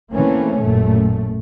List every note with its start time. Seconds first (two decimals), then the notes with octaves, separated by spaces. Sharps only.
0.12 E3 A3 A#3 C4 C#4
0.60 A1 F#2 A#2 A3